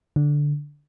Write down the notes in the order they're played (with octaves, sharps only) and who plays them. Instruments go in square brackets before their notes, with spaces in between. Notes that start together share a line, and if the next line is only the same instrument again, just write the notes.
[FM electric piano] D3